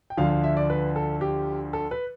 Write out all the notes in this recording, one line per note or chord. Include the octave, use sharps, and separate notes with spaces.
G5
D2 D3 F3 F5
F5
E5
D5
B4
A4
G4
A4
B4